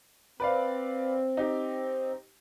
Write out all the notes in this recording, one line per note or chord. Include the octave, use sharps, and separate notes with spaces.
C4 B4 D5 F5
D#4 G4